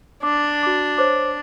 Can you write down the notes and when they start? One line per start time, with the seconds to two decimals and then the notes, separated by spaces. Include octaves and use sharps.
0.23 D4 D6
0.63 F#4 D6
0.98 C5 C#5 D6